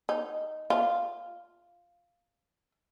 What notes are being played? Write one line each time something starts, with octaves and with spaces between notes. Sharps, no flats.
D#4
F4